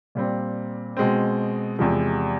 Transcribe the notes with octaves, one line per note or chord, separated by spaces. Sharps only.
A#2 G3 C4
B2 G#3 C4
E2 C3 F3 G#3